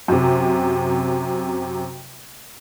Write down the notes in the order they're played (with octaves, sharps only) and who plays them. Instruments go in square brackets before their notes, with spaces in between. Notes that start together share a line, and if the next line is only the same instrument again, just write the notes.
[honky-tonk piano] F#2 C3